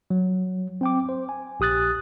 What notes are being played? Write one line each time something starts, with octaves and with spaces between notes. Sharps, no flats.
F#3
C4 G5 D6
C5
G#5
A#1 G4 D#6 F#6 A6